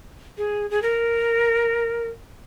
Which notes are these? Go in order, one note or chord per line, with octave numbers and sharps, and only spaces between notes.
G#4
G#4
A#4